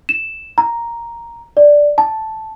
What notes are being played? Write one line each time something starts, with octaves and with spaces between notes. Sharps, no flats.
E7
A#5
D5
A5